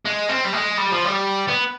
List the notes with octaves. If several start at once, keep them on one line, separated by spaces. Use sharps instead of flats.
G#3
C4
G3
G#3
G3
F3
G3
B3